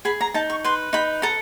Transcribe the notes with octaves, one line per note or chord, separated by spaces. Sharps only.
G#4 B5
A#5
D#4 A5
C#6
B4 C6
D#4 B5
A4 A#5